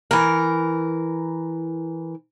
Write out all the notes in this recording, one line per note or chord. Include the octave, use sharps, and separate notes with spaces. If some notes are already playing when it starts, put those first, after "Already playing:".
E3 A#4